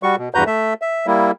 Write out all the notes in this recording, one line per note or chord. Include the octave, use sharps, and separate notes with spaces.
G3 F#4 C#6
B2
E2 G2 F#4 B4 A#5 G6
A3 E5
E5
G3 A#3 E4